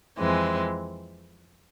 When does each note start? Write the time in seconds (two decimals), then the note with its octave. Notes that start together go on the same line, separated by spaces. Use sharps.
0.18 F2 E3 G#3 C4